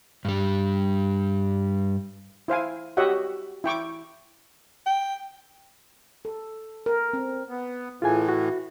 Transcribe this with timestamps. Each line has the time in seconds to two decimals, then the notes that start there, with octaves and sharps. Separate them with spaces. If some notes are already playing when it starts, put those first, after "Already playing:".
0.25 G2 G3
2.48 E4 C5 F5 G#5
2.97 F#4 G4 C#5 D#5 E5 F#5
3.64 E4 G5 C#6 D6
4.86 G5
6.25 A4
6.86 A#4
7.13 C4
7.49 B3
8.02 A2 E3 F4 G#4 G#5
8.29 F#4